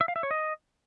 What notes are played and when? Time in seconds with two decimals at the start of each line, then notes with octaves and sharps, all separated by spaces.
0.01 E5
0.08 F5
0.16 E5
0.23 C#5
0.31 D#5